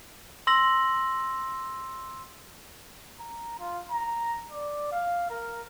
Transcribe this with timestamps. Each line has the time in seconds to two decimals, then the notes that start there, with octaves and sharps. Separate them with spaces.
0.47 C6 E6 A#6 F#7
3.20 A#5
3.60 F4
3.92 A#5
4.52 D5
4.91 F5
5.30 A#4